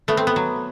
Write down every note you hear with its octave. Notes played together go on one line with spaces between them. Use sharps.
A3 B3
C4
B3
F#3